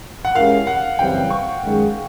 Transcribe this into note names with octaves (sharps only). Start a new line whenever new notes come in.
F#5
G#3 C#4 E4 G4 A#4 F5
F#5
F#2 C#3 E3 G3 C4 G5
C#6
F#2 D#3 G#3